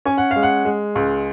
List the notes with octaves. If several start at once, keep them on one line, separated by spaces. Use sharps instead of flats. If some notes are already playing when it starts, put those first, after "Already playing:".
C#4 G#5
F#5
G#3 F5
F#5
G#3
C#2